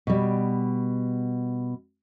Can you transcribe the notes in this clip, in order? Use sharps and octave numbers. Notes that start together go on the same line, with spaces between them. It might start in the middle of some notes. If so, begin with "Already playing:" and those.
B2 G3